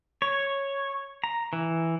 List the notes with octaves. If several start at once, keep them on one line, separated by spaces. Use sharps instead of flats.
C#5
A#5
E3